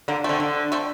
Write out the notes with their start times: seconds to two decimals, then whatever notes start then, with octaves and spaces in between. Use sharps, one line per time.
0.08 D3 A#3
0.24 A3 C4
0.29 D3
0.40 D3
0.72 A3 C4